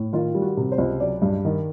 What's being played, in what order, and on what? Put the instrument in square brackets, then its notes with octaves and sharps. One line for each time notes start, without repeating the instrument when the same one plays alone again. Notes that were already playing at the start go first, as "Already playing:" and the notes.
Already playing: [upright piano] A2
D#3 F4
G3
F#4
C3
C5
C#2
F#3 D5
G2
D#3